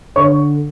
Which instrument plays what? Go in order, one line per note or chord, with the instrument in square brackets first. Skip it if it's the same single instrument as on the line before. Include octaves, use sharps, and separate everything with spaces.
[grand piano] D3 C#5 C#6